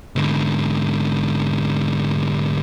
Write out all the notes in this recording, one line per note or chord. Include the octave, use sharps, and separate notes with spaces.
G#2 D3